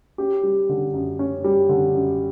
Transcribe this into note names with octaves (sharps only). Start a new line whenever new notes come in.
C#4 G4
G3
D3
F#2
C#4
G3
D3
F#2